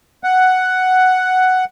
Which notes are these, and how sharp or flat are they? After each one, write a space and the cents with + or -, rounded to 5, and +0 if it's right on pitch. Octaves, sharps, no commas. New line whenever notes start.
F#5 +5